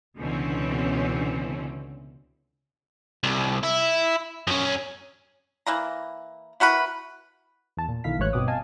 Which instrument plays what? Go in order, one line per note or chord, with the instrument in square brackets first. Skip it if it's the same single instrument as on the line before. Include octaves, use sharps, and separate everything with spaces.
[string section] C#2 B2 D3 E3 C4 C#4
[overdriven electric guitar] C2
E4
F#2 C#4
[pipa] E3 A#3 A#5
E4 F#4 A#4 B4
[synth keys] E2 A5
A#2
B1 D3 D#3 E4 F5 B6
A1 G#2 E3 C#5 F#6
G1 G2 B2 C4 D6 D#6
D#5 F5 G#5 A5